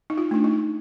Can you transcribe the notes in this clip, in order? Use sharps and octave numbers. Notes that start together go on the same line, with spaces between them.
D#4
F4
A3 D4
D#4